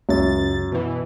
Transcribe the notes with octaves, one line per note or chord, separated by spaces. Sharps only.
C#2 F#2 A6
B2 E3